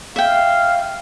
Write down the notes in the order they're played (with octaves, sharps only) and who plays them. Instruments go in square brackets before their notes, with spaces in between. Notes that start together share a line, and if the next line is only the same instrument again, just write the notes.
[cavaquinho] E5 G5 [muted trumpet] F5